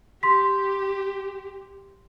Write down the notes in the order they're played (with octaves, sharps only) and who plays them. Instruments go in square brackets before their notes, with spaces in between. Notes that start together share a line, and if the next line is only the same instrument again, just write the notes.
[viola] G4 [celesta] C6 B6